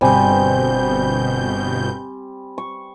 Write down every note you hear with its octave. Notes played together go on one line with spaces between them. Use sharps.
G1 B2 G3 C4 G#5 G6
C#6